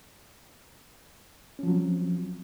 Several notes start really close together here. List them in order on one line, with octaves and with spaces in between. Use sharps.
C#4 F3 F#3 C4